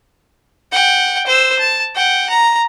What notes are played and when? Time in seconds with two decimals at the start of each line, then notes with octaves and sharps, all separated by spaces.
0.72 F#5 G5
1.27 C5 E6
1.59 A5
1.95 F#5 G5
2.30 A#5